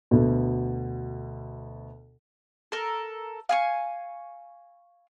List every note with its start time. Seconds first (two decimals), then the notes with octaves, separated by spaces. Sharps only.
0.11 D2 B2
2.72 A4 A#4
3.49 F5 G#5 C#6